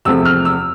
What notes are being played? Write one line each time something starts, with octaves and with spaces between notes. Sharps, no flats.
E2 C3 F3 A3 E6
F6
E6